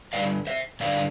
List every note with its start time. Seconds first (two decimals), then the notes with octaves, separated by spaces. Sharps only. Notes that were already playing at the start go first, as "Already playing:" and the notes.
0.13 G2 D3 G3 D5 F5
0.47 C5 E5
0.80 G2 D3 G3 D5 F5